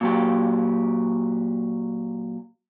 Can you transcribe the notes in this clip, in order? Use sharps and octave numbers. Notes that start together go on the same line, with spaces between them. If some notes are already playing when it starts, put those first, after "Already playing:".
A#2 F#3 G4